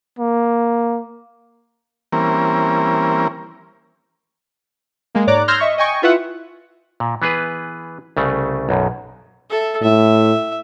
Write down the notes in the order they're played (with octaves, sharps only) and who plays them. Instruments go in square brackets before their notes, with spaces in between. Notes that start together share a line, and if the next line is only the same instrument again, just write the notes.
[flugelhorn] A#3
[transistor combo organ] E3 G3 A#3 C4 C#4 A#4
[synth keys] G#3 A#3
G#2 C#5 D5 A#5 D6 F#6
C6 E6 F6 G6 G#6 A#6
D#5 E5 C#6
D#5 G5 G#5 C#6
E4 F4 B4 E5 F#5
[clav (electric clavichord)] A#2
E3 B3 G#4 B4
C2 C#3 A3
B1 F#2 B2
[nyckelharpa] A4 E5
[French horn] A2 [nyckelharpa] E5